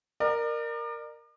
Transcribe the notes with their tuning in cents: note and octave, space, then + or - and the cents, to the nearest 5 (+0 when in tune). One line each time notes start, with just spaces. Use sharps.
A#4 +0 D5 +40